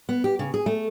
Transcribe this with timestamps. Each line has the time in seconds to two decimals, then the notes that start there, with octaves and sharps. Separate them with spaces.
0.09 B3
0.24 G4
0.39 C#3
0.54 G#4
0.66 A3